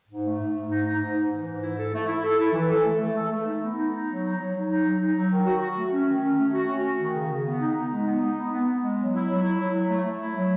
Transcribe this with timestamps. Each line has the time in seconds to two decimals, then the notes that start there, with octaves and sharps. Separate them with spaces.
0.09 G#2
0.25 A3
0.40 G#2
0.56 G#2
0.70 D#4
0.86 D#4
1.01 G#2
1.16 G#2
1.31 E3
1.47 G#2
1.62 E4
1.77 A4
1.93 A3
2.07 E4
2.24 A4
2.39 E4
2.53 E3
2.70 A4
2.85 A3
3.00 A3
3.15 A4
3.30 A3
3.46 D#4
3.62 B3
3.77 D#4
3.91 D#4
4.08 F#3
4.23 D#4
4.37 F#3
4.54 F#3
4.69 D#4
4.84 F#3
4.99 D#4
5.14 F#3
5.30 D#3
5.45 F#4
5.60 F#4
5.75 A3
5.91 C#4
6.06 D#3
6.21 C#4
6.37 A3
6.52 F#4
6.67 C#4
6.82 F#4
6.98 D#3
7.14 C#3
7.29 C#3
7.45 B3
7.60 D#4
7.75 D#4
7.91 G#3
8.05 B3
8.20 D#4
8.37 B3
8.52 B3
8.67 B3
8.81 G#3
8.98 F#3
9.13 E4
9.27 F#3
9.43 E4
9.59 F#3
9.73 F#3
9.89 A3
10.04 A3
10.20 E4
10.36 F#3